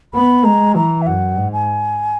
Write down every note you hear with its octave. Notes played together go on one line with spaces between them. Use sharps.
B3 B5
G#3 A#5
E3 A#5
E5
F#2 F#5
G#2
G#5